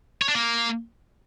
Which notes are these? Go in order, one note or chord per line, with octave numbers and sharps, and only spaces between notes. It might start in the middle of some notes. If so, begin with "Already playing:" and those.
C#5
D4
A#3